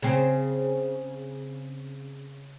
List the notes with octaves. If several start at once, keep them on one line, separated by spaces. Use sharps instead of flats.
C#3 C4